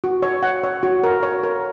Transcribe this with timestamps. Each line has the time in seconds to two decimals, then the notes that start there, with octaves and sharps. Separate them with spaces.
0.04 F#4
0.22 C#5
0.43 F#5
0.64 C#5
0.83 F#4
1.04 A#4
1.23 C#5
1.43 A#4